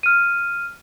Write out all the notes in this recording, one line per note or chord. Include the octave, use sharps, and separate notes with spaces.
F6 D#7